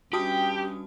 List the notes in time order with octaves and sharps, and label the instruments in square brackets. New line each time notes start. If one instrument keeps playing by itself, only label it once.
[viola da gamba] G2 C#4 [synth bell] F#4 A5 D#6 [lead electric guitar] G4 [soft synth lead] G5